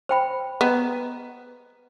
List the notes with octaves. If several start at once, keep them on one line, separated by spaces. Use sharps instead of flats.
C5 G5 B5
B3 D#5 A#5